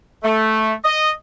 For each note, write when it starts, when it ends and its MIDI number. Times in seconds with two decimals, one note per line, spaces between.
0.23 0.74 57
0.84 1.10 75